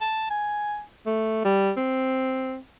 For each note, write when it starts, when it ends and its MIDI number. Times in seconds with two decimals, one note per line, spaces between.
0.01 0.26 81
0.30 0.82 80
1.06 1.41 57
1.45 1.72 55
1.77 2.57 60